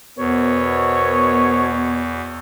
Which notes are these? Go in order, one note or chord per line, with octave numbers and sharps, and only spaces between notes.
E2 B2 B3 A#4 C5 C#5